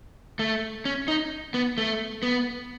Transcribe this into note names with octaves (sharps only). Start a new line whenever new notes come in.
A3
C#4
D#4
B3
A3
B3